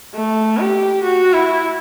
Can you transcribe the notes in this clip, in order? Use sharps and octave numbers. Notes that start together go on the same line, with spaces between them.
A3
G4
F#4
E4